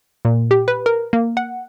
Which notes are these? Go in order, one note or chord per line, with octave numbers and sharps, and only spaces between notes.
A#2
G4
B4
A#4
A#3
F#5